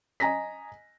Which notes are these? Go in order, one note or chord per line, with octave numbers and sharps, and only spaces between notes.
D#5 G#5 A#5 A#6 B6